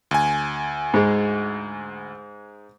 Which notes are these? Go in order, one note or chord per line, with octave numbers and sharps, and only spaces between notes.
D2 G#5
G#2 G#3